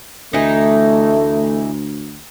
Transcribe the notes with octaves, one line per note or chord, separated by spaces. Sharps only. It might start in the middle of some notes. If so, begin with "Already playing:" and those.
D2 E3 A3 D#4